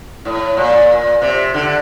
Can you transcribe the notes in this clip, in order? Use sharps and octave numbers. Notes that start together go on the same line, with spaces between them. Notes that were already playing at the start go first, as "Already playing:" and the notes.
A2
A#2
C3
D3